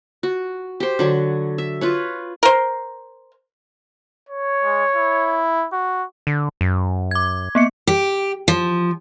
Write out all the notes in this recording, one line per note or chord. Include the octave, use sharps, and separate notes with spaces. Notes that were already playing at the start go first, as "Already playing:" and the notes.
F#4
G4 C5
D3 F#3 C#5
E5
F4 B4 C#5
A#4 C5
C#5
G#3
E4
F#4
D3
F#2
D6 G#6
A#3 B3 C#7
G4
F3